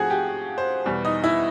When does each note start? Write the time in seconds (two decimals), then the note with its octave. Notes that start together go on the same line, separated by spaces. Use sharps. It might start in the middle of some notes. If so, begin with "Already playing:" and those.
Already playing: G#2 F3 A3 C4 F#4 G#4 F#5 G#5
0.10 G4 G5
0.58 C5
0.86 E2 B2 G3
1.05 D#4 D#5
1.24 E4 E5